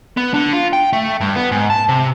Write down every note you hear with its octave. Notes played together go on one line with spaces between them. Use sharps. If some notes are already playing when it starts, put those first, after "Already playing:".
B3
D3
F4
G5
A3
G2
B3
G#2
A5
C3